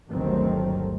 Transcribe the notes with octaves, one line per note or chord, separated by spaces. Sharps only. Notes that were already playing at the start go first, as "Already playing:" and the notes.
G1 D2 D#3 F#3 A3 C4